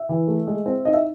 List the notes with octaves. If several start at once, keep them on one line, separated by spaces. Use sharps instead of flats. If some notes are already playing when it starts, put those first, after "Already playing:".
Already playing: E5
E3
A3
G#3
C4
D#4 D#5
E5